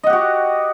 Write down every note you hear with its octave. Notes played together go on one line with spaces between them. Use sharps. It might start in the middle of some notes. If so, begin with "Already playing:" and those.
F#4 G4 D#5 F#5